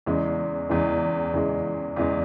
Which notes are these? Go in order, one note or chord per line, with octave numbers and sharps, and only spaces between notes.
E2 C#3 E3 G#3
E2 C#3 E3 G#3
E2 C#3 E3 G#3
E2 C#3 E3 G#3